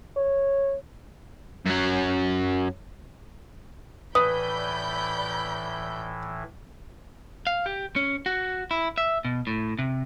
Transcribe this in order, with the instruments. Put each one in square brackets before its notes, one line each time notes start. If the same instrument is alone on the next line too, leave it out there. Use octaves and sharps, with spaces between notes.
[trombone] C#5
[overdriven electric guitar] F#2 F#3
[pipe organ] A2 E3 [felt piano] B4 [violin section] D5 B5 G6 [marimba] D#6
[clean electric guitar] F5
G4
C#4
F#4
E4
E5
B2
A2
C3